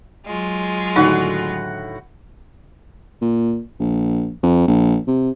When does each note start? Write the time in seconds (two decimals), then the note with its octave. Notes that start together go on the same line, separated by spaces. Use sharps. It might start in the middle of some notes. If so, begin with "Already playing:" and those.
0.24 F#3 G#3 F4
0.96 A2 D3 D#3 D#4 F#4 F#5
3.22 A#2
3.80 A#1
4.43 F2
4.68 A#1
5.07 C3